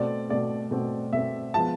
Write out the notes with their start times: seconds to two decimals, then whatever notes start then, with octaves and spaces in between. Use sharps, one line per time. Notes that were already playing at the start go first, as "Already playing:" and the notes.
Already playing: B2 A3 C4 D5
0.29 B2 A3 C4 D5
0.71 B2 A3 C4
1.13 B2 A3 C4 E5
1.54 F3 G#3 B3 A5